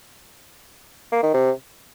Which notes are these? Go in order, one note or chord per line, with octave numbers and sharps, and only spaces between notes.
A#3
D#3
C3